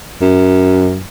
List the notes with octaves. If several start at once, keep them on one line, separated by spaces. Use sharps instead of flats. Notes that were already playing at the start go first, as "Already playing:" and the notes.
F#2